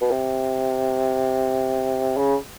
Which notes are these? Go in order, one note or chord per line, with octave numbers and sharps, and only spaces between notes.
B2
C3
C#3